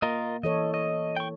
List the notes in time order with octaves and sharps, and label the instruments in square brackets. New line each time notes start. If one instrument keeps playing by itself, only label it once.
[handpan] A#3 [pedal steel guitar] F4 A#4 D#5
[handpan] E3 A4 C#5 [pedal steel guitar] D#5
[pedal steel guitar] D#5
G5 C#6